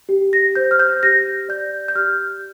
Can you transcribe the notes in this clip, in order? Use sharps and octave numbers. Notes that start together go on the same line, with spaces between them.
G4
A#6
C5 G6
F6
G6
G4 A#6
D5 G6
G6
G4 F6